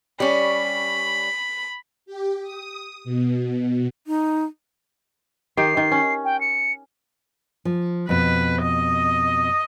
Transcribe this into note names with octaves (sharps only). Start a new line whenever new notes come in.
G3 C#4 B5
G4
D#6
B2
D#4
D#3 G4 C7
D#3
C#4
G5
C#7
F3
F2 B2 B4
D#5